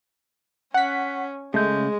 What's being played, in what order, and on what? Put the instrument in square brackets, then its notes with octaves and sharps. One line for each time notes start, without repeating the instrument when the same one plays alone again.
[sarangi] C#4 [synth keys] F#5 B6
[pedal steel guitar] C#3 G6 [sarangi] G#3 [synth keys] A3